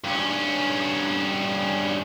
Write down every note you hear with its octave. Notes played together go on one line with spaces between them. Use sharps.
G2 C#4